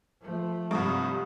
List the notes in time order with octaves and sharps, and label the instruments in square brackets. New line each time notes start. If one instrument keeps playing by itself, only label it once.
[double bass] F3 A3
[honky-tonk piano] C2 G2 [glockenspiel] C#6 D#6